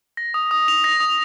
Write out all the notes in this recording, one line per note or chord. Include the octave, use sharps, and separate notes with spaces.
A#6
D#6
D#6
F7
A#6
D#6